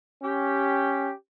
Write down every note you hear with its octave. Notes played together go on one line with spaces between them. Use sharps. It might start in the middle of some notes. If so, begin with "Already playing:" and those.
C#4 G4